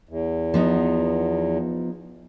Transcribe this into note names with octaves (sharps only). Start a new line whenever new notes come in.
E2
F3 B3 D#4